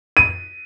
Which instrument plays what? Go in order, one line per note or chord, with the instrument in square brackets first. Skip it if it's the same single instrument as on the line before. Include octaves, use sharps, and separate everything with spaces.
[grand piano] D#7